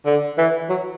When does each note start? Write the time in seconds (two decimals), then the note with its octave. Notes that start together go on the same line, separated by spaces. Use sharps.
0.06 D3
0.38 E3
0.69 F#3